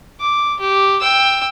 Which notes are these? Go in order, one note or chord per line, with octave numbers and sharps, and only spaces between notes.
D6
G4
G5 E6